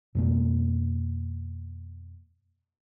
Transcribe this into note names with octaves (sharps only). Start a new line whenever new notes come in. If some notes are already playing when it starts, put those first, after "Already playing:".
F2 B2 A#3